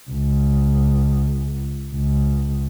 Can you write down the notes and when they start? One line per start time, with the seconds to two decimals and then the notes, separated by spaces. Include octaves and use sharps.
0.10 C#2
1.95 C#2